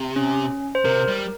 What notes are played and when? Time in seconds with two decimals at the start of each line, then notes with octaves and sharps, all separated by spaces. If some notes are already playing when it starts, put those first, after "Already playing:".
Already playing: C3
0.16 C#4
0.75 C5
0.85 C3 A#4
1.08 G3